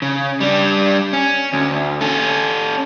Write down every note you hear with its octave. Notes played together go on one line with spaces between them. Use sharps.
C#3
G3 D4
C#4
D2
C#4 A4